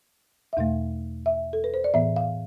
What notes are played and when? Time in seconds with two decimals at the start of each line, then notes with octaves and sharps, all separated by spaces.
0.53 E5
0.57 E2 B2 A3 F5
1.26 E5
1.53 A4
1.64 B4
1.74 C5
1.84 D5
1.94 A2 E3 B3 E5
2.16 F5